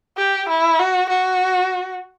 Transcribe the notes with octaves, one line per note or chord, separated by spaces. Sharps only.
G4
E4
F#4
F#4